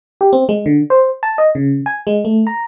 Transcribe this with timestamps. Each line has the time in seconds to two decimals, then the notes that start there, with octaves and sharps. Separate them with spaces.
0.21 G4
0.33 C4
0.49 G#3
0.66 D3
0.90 C5
1.23 A5
1.38 D#5
1.55 C#3
1.86 G#5
2.07 G#3
2.25 A3
2.47 A#5